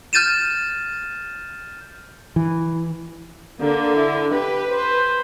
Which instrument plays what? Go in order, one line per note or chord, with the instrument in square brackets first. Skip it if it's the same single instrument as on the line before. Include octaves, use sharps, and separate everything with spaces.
[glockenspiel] F6 G6 A6 D#7 E7
[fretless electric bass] E3
[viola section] D3 [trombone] A#3
[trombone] E4
[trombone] G4 [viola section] B4
[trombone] C5